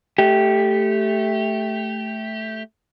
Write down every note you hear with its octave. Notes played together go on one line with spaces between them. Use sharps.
A3 G4